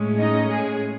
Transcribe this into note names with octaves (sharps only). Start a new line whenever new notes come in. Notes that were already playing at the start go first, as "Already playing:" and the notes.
Already playing: A2 G#3 C#4
D#4 D#5
G#3 G#4